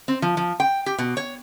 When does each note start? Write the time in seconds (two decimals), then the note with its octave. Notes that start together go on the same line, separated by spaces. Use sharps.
0.08 C4
0.22 F3
0.37 F3
0.60 G5
0.86 G4
0.98 B2
1.17 C#5